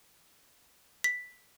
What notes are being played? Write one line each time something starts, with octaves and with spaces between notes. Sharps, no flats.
B6